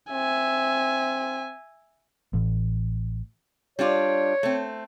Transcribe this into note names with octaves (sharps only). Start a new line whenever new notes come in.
C4 E5 G#5
A1
G3 D4 F4 C#5
A3 C4